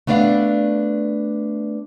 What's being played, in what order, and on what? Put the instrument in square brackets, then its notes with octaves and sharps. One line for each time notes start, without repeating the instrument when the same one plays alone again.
[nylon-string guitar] A3 B3 D4 D5 F5